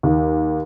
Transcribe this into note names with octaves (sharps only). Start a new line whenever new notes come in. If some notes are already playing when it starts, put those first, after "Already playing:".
D#2